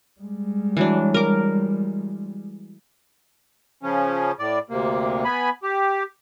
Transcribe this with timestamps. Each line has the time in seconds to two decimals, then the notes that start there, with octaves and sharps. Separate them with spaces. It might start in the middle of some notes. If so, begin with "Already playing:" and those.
0.21 G3 G#3
0.77 E3 F#3 D4
1.14 A#4 D6
3.83 C#3 F3 C#4
4.39 A2 D5
4.70 D2 C3 A#3
5.25 B3 G#5 B5
5.63 G4